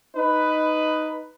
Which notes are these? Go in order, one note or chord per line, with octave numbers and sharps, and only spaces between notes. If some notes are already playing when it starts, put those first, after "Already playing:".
D#4 B4